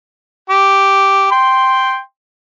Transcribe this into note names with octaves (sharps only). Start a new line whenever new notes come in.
G4
G5 C6